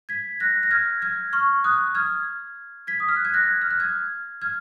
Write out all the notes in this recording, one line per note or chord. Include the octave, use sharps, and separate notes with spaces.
G#6 B6
F#6 A#6
A#6
F6 G#6
F6 G#6
C#6 F6
D#6 F#6
F6 G#6
G#6 B6
D#6
F6
F#6
G#6
F#6 A#6
F6
F#6
F6 G#6
F6 G#6